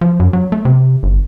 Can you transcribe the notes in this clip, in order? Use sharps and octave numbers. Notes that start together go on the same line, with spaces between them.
F3
F#2
F#3
A3
C3
G1